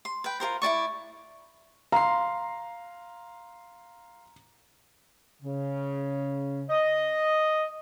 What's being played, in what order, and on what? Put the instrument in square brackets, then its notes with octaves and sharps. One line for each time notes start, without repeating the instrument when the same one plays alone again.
[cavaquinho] C6
B4 G5
F4 G4 A#4 C5
E4 F#4 D5 C#6
[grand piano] F5 C6 C7 [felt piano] A#5
[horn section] C#3
D#5